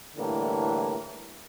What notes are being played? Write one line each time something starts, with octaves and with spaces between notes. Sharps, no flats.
A2 D3 E3 G3 A#3